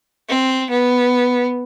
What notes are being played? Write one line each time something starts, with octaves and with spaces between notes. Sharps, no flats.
C4
B3